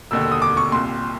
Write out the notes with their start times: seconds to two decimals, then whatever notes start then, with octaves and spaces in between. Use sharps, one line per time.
0.11 E1 D#2 D3 E6
0.21 E6
0.31 D#6
0.42 D6
0.57 C#6
0.72 C2 A#2 C6